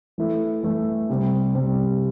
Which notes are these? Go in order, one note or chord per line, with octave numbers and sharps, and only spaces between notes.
E3 A3 E4 A4
E3 A3 E4 A4
C3 G3 C4
C3 G3 C4